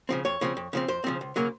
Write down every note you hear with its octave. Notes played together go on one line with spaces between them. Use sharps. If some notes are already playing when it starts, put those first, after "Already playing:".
C#3 F3 C4
F2 C#5
C#3 F3 C4
F2
C#3 F3 C4
F2 C5
C#3 F3 C4
C#2
C#3 F#3 A#3